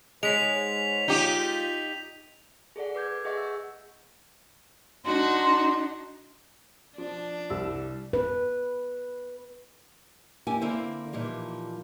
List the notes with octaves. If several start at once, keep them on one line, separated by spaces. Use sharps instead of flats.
G#2 G#3 C#5 B6 F7
D#4 F4 G4
G#4 A4 D5 F#5
B4 D6 G6 G#6
G#4 D#5 E5 F#5 C#6
E6
D4 D#4 F#4 C6
F3 D4
C2 G3 E6
B4
F2 A#3 E4 G4 G#5
D3 A#3 C4 E4 A4 C5
A#2 E3 F3 G3 D#4